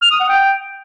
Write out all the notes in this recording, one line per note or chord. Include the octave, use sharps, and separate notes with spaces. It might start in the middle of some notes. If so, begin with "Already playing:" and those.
F6
D#6
F#5
G5